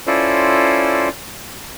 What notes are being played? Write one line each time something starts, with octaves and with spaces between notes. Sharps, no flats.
C#4 E4 F4 A4 C5 D5